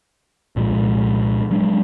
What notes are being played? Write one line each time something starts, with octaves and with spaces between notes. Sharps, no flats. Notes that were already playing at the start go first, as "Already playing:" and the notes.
C2 A#2 F3 G#3
F#3 G#3 D4